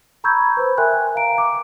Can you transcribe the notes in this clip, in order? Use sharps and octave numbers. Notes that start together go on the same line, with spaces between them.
A#5 B5 C#6 E6 G6 G#6
B4 C5 B5
A#4 E5 G5 G#5 C6 F#6
F5 A#5 D7
D6